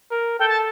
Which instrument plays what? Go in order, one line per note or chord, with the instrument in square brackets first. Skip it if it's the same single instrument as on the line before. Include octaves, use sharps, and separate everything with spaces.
[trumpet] A#4
[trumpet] A4 [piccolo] G5
[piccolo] A5